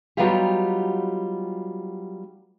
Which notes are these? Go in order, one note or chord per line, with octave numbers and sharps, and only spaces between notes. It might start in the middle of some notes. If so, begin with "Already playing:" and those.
F#3 G3 B3 D#4 F4 G4